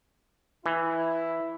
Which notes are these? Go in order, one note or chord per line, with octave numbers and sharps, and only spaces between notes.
E3 E4